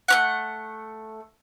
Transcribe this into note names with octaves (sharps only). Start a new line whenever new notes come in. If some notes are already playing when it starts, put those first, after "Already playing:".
A3 C#4 F#5